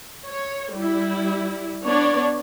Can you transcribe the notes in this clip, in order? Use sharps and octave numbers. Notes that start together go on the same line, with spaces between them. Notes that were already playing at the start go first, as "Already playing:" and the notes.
C#5
G3 E4
B3 D4 C#5 D5